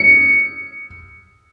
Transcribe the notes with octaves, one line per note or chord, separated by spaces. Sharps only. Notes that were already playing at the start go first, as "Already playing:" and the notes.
Already playing: C#7